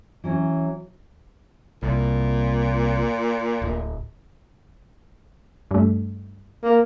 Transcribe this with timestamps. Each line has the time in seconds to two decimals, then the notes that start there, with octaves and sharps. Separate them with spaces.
0.24 E3 F#3 C#4
1.83 C2 A#2
3.62 D1
5.71 G2 A3
6.64 A#3